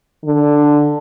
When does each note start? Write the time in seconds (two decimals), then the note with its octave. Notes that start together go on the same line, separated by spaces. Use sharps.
0.25 D3